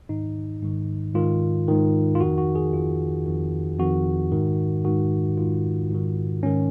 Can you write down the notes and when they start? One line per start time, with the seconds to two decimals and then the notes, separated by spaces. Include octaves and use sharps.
0.09 G#2 D#3 D#4
0.62 G#2 D#3
1.15 G#2 D#3 F4
1.68 G#2 D#3
2.15 F4
2.20 F2 D#3 F#4
2.38 F#4
2.55 G#4
2.73 F2 D#3 F4
3.26 F2 D#3
3.79 F2 D#3 F#4
4.32 G#2 D#3
4.84 G#2 D#3 F#4
5.38 G#2 D#3 F4
5.91 G#2 D#3
6.43 G#2 D#3 C#4